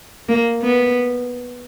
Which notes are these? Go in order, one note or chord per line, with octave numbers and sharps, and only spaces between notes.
A#3
B3